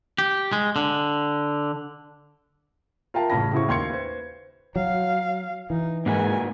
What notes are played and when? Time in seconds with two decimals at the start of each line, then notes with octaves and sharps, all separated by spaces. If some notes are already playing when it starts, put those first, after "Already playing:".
0.18 G4
0.53 G#3
0.76 D3
3.14 F4 A#4 E5 F5 G5 A5
3.30 A1 C#3 C#4 A5 B5 A#6
3.52 A2 C#3 E4 F#4 C5 C#6
3.68 D#2 F5 C6 G#6 C#7
3.90 B4 C5
4.76 F#3 F5
5.70 E3 D#4
6.06 G#2 A#3 F#4 B4 G#5